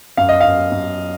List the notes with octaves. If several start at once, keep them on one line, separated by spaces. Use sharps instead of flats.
F#2 F5
D#5
F#2 F5
F#2